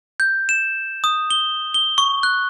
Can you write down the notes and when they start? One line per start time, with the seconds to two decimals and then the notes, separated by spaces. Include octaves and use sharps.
0.20 G6
0.49 E7
1.04 D#6
1.30 G7
1.74 G7
1.98 C#6
2.23 F#6